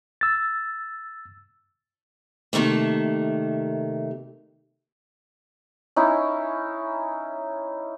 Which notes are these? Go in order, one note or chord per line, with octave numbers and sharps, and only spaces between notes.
E6 A6
C3 D#3 A3 A#3
C#4 D#4 E4